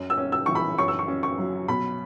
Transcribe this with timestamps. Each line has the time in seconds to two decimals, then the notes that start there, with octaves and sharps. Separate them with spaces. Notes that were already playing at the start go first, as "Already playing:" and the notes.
Already playing: F#2
0.10 E6
0.18 C#4
0.32 E6
0.46 E3 C#6
0.55 B5
0.78 F#2 C#6
0.88 E6
0.99 C#6
1.08 C#4
1.23 C#6
1.38 F#3
1.68 B2 B5